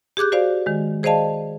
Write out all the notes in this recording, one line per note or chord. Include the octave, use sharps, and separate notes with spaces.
G4 G#4 D6 F#6 G6
F#4 C5 D5 F5
D#3 G#3
G#4 C5 D5 D#5 F5 A5